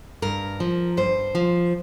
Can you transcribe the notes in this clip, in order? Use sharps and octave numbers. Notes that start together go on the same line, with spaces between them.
G2 A#4
F3
G2 C5
F3